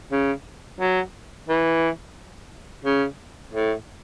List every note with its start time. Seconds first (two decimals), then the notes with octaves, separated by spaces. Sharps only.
0.12 C#3
0.80 F#3
1.48 E3
2.85 C#3
3.53 A2